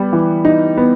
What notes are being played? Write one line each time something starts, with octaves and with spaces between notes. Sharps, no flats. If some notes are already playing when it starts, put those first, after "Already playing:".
Already playing: G3 B3
E3
D#4
B3